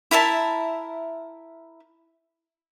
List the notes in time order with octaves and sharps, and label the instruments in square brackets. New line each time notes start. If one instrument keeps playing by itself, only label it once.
[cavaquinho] E4 A#4 E5 A5